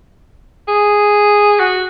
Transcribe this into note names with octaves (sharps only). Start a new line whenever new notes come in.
G#4
F#4